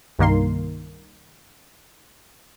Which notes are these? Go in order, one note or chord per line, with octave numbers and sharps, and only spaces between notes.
C2 G2 D#3 A#3 A#4 C6